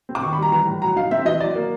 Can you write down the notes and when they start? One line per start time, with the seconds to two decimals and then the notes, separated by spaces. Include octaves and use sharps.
0.09 C4
0.15 D6
0.22 D#3 C#6
0.33 B5
0.38 G3 A#5
0.52 E3 A#5
0.66 A2
0.82 F#3 A#5
0.96 D#4 F5
1.11 C4 E5
1.25 E3 D#5
1.40 F#3 D5
1.55 A#3